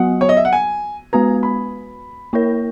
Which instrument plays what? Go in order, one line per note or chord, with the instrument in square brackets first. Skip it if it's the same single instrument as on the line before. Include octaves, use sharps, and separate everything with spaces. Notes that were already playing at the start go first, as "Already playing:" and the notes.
Already playing: [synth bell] F#3 B3 F#4 [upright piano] F#5
[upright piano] C#5
D#5
E5
F#5
G#5
[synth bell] G#3 B3 F#4 B4 [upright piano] A#5
[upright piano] B5
[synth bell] A#3 E4 A#4 C#5